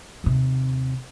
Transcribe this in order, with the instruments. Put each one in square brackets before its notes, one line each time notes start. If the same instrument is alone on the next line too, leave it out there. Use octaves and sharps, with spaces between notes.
[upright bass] D#2 C3